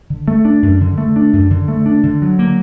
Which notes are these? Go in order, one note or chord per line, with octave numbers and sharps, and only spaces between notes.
D3
A3
D4
F#2
D3
A3
D4
F#2
D3
A3
D4
D3
F#3
A#3